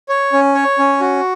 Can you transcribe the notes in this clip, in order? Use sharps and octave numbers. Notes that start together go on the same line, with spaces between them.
C#5
C#4
C#5
C#4
F#4